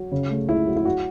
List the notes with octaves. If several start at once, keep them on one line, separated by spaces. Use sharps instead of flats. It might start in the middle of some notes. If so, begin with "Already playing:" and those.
Already playing: F#3
C#3
A3
C#2 E4
F#3
E4
F#4